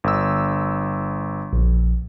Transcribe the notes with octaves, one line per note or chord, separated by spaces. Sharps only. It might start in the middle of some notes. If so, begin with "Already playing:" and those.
G1 E6
A#1